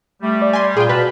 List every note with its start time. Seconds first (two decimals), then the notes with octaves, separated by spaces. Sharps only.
0.23 G3 A3
0.42 D5
0.53 G#5 C6
0.77 A#2 F4 G#4 G5 C6
0.89 B2 B4 F5 A5 B5